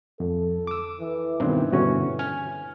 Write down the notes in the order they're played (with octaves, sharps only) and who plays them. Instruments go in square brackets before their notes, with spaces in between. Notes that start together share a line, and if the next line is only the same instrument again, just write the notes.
[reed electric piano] F2 [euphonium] A4
[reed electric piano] D6 E6
[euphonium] E3
[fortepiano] G2 [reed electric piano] B2 D#3 C4 [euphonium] E3
[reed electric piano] G2 B2 D3 [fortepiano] C#4 F#4
[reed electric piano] G#5 F6